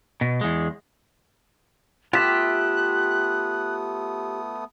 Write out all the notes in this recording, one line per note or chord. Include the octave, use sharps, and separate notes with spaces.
B2
E2 G#3
A3 B3 F4 G4 E5 D#6 F#6